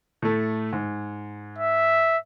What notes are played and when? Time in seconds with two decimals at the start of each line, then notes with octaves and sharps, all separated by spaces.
0.22 A2 A3
0.73 G#2
1.58 E5